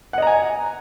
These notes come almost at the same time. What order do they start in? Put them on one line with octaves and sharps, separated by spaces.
F#5 D#5 A#5 G#5